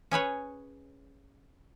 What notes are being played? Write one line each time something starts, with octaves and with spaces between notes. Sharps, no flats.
C#4 G#4 B4 C#5